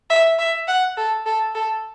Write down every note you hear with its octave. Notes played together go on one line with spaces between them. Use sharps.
E5
E5
F#5
A4
A4
A4